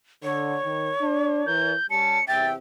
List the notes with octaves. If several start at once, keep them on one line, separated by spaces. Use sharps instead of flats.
D3 C#5
D#3
D4
E3 A#4 G6
G3 C#4 A5 C#7
E2 C3 E5 G5 A6